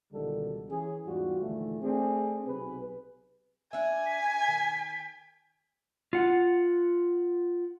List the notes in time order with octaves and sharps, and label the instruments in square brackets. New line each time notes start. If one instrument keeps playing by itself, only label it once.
[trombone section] C#2 B2 D3 D#3 G3 A4
E3 C#4 G#4
E2 G#2 G3 F4 F#4
A#1 D#2 D3 E3 F3 A3
A3 C4 D4 G#4
B1 C3 G#4 B4
[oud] D4 E5 [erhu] G#5
[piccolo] B6
[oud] D#3
[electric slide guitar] F4 F#5